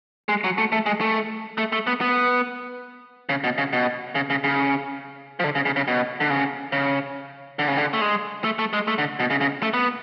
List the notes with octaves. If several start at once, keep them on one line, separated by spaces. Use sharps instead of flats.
G#3
F#3
A3
A3
G#3
A3
A3
A3
B3
B3
C#3
B2
C#3
B2
C#3
C#3
C#3
F3
D3
C#3
C#3
C#3
B2
D3
C#3
C#3
D3
C#3
D3
A3
G#3
A3
A3
G#3
A3
D3
B2
C#3
C#3
A3
B3